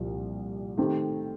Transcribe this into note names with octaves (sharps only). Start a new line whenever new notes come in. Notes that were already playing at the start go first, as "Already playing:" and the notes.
Already playing: C2 A#2 F3 A#3 F4
D#3 A3 C4 G4